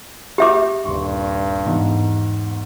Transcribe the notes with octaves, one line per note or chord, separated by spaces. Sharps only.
G4 E5 D6
D#1 G2 C6 C#6
E2 G#2